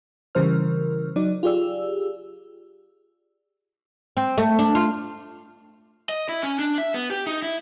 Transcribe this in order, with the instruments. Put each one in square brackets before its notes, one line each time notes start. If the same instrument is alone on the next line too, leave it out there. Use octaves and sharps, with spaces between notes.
[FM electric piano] C#3 E3 G3 A#4 C5 F6
F#3 D#4 D5
F4 G4 G#4 D5 E6
[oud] C4
A3
D4
F4
[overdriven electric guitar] D#5
E4
C#4
D4
E5
B3
G4
D#4
E4